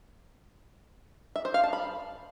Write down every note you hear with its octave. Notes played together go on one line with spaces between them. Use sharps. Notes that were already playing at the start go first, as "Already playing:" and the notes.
E5
C5
F5
A5
B5